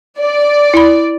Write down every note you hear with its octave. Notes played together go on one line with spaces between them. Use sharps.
D5
E4 B5